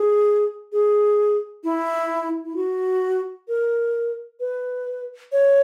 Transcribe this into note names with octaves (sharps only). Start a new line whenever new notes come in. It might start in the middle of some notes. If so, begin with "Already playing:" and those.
Already playing: G#4
G#4
E4
E4
F#4
A#4
B4
C#5